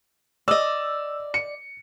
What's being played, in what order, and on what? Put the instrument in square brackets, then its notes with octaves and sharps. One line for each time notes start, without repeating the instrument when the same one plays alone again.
[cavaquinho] D5 D#5 [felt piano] E6
[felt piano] C#7